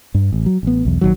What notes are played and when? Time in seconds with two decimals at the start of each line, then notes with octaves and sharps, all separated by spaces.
0.14 G2
0.32 A1
0.46 F#3
0.63 A1 B3
0.85 B1 E2
1.01 A#1 D#2 D#3 F#3